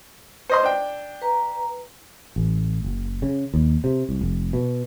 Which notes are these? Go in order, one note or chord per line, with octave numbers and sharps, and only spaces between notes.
C5 D#5 C6
D4 G5
B4 A#5
A1
F#1
C#3
D#2
C3
C2
F1
B2